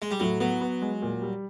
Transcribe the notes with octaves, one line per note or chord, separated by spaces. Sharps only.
G#3
G3
A2 F#3
F#3 B3
B3
G#3
A#2
G3